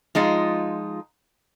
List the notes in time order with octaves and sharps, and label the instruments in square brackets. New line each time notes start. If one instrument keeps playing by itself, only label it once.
[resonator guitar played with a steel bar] F3 G#3 D#4 F4